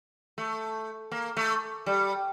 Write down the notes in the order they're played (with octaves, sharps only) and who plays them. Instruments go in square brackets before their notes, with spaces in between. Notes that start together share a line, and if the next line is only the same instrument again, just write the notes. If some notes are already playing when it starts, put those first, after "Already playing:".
[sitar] A3
A#3
A3
G3